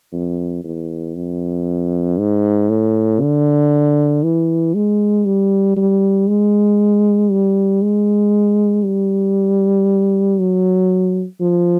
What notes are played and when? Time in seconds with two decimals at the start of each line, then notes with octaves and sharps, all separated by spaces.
0.13 F2
0.64 E2
1.15 F2
2.19 G#2
2.69 A2
3.21 D3
4.23 E3
4.75 G#3
5.26 G3
5.77 G3
6.28 G#3
7.31 G3
7.82 G#3
8.85 G3
10.39 F#3
11.41 F3